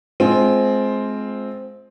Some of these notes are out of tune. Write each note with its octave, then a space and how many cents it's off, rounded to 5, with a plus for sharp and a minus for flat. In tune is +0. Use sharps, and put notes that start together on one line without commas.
G#3 +25 C4 +0 F4 +0